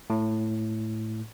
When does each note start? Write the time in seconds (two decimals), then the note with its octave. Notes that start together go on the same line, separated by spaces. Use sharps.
0.10 A2